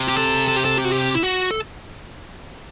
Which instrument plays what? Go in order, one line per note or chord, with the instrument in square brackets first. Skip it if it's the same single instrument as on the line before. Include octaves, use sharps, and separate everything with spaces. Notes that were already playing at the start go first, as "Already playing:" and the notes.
Already playing: [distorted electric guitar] C3
[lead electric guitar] G4
A4
A4
G4
A4
G4
F#4
G4
E4
F#4
A4